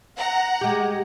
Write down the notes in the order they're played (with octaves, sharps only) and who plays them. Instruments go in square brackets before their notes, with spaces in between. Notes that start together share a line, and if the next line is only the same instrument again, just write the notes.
[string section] F#5 A#5
[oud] G#3 G4